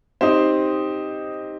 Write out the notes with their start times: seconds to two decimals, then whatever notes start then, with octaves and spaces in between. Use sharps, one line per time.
0.21 C4 D#4 G4 C5